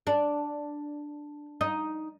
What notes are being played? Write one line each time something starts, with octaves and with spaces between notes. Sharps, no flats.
D4
D#4